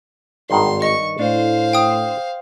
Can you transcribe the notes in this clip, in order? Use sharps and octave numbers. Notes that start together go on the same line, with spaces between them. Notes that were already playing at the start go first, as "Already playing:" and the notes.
G#1 G2 D#3 F#5 C6
D#5 C#6
A2 D4 C5 F5
G5 D#6